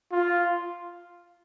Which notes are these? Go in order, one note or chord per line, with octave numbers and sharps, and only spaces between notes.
F4